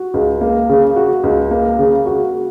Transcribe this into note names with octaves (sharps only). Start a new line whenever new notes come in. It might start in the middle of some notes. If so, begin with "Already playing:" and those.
Already playing: F#4
C#2
A#3
C#3
F#4
C#2
A#3
C#3
F#4